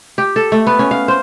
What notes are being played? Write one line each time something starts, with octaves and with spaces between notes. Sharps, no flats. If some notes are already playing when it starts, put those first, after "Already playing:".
G4
A4
A3
B3
C#4
F5
C5